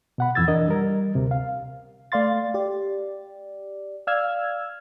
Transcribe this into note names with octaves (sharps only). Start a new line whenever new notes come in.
B2 F#5 B5
F2 E3 E6 G#6 A6
E3 D4 A#4 D#5
G3 A#4
D2 C3
F5
A3 D5 F5 C6 A6
G4 D5
D5 F5 E6 F6 G#6